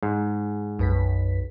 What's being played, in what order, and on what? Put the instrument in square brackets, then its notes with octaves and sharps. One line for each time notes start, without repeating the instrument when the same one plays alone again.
[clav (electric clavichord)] G#2
[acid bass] B1 [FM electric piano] F#2 B4 B6